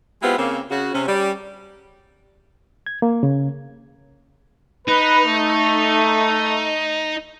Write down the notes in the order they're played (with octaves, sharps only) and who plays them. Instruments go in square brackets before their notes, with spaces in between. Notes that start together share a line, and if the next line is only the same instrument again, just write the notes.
[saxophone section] G#3 B3 C4 E4 F4 G4
C#3 A#3 C4
C#3 F#4
C3 C4 C#4
G3 C#4 D5
[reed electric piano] G#6
A#3
C#3
[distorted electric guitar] D#4 [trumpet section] B4
[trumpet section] A3